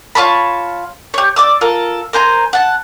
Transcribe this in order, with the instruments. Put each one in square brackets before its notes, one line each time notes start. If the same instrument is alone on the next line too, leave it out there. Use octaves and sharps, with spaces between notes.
[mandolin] F4 C#5 A5 B5
G4 C#5
D5 D6 E6
F4 A4 A#4
A#4 C5 G#5 A#5
F#5 A5